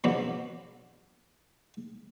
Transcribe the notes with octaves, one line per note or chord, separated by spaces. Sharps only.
E2 B2 F3 F#3 B3 D4